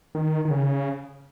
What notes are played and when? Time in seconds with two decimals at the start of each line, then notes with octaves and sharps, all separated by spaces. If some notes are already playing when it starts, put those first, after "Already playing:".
0.15 D#3
0.45 D#3
0.50 C#3